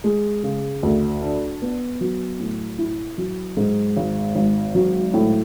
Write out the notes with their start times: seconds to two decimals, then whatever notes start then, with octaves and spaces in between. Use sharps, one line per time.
0.04 G#3
0.43 C#3
0.83 D2
1.22 D4
1.62 B3
2.01 F#3
2.40 A2
2.79 E4
3.18 F#3
3.57 G#2
3.97 G#1
4.35 G#1
4.75 F#3
5.14 A2